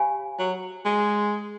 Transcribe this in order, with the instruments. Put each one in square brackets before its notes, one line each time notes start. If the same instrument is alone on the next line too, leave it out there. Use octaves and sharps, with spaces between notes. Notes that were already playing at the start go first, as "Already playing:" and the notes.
Already playing: [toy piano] G4 C5 F5 G#5 B5
[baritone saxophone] F#3
G#3